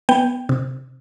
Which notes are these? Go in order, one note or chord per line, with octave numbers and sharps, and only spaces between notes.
B3 G5
C3